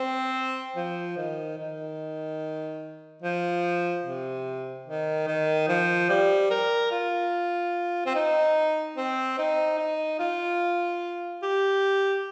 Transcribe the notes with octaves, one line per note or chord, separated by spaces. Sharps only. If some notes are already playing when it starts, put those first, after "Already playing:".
Already playing: C4
F3
D#3
D#3
F3
C3
D#3
D#3
F3
G3
A#4
F4
C4
D#4
C4
D#4
D#4
F4
G4